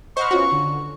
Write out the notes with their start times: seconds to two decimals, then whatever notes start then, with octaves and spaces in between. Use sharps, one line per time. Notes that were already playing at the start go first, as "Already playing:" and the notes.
0.17 C5 D#5 F#5 B5 C#6 F6
0.31 B3 C#4 F4 F#4
0.52 D3